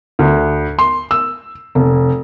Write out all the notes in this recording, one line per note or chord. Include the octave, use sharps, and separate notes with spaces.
D2
C6
E6
F1